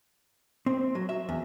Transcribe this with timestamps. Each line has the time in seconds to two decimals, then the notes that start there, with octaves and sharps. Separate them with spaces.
0.66 C4
0.95 F#3
1.09 E5
1.29 E2